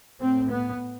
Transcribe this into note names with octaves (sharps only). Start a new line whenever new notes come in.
A2 C4
B3